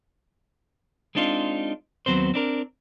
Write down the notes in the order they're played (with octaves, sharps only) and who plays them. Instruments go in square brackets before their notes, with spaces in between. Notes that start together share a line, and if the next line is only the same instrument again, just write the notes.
[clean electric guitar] G#3 C4 D4 D#4 F4
D#2 F#3 B3 C4 C5
C4 D4 A#4